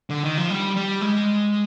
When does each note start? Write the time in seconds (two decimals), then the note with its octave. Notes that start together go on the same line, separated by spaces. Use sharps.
0.10 D3
0.23 D#3
0.37 F3
0.50 G3
0.76 G3
1.01 G#3